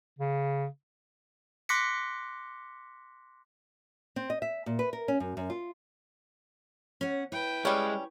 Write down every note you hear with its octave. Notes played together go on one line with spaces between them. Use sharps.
C#3
C6 D6 F#6 A#6 B6 C#7
C4
D#5
E5
A#2
B4
A#4
C#4
F#2
F#2
F4
C#4 F#5
E4 B4 G5
G3 G#3 C#4